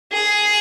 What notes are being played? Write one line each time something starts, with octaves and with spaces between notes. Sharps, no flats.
G#4